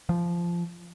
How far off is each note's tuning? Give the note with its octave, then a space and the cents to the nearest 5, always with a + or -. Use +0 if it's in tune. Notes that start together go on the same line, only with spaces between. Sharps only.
F3 -15